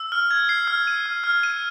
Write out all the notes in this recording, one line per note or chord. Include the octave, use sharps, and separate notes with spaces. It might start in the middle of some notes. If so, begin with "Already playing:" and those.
Already playing: E6
F6
G#6
C7
F6
D#7
F6
F6
D#7